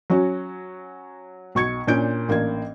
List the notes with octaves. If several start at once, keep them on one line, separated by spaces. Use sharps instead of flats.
F#3 C#4 F#4
B1 C#6 G#6 C#7
A#2 C#4 D4 G6 D7
A1 A#3 D4 G#6